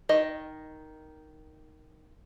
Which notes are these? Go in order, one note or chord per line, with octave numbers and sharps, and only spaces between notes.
D#3 D#5